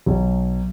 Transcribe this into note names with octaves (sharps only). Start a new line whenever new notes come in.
B1